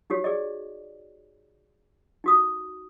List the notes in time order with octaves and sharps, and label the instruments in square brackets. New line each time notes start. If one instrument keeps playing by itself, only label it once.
[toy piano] D#4 F#4 G4 C#5
G#4 D5 D#5
D#4 F#4 D#6